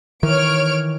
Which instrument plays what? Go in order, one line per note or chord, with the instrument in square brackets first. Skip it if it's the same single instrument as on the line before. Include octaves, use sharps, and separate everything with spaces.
[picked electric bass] D#3 E3 [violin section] C#5 F6 D7